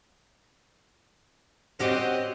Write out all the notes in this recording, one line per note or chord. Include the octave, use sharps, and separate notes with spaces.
C4 C#4 F#4 G4 D#5